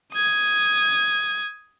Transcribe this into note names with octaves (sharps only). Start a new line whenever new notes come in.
D#6 G#6